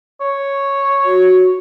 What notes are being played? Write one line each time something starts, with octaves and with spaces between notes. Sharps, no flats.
C#5
F#4